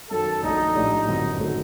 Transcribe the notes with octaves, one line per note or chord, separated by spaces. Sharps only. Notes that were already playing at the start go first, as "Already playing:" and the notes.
F#2 D#3 F#3 A4
A#1 A#2 F#3 A3 D#4
A#1 A2 A3 D4 G4
G1 F#2 F#3 C4
D#3 F#3 A3